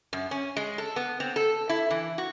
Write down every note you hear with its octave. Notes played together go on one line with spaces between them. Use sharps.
F#2
C#4
G#3
A4
B3
C4
A4
E4
E3
F#4